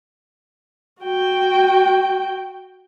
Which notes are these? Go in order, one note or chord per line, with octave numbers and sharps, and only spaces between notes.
F#4 G5